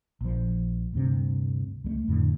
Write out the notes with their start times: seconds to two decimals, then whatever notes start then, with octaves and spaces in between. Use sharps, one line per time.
0.21 A#1 F3
0.93 D2 G2 C3
1.84 C#2 G#3 A3
2.08 F2 A2 D3